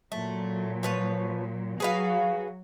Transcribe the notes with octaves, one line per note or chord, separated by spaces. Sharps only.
A#2 F#3 A3
F3 B4 C#5
F#3 F#4 G#4 B4 F5